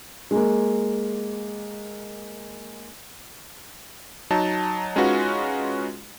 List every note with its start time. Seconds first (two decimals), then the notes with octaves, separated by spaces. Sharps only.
0.31 G#3 A#3
4.30 F#3 D#4 A5
4.96 G#3 C#4 D#4 F4 F#4 B4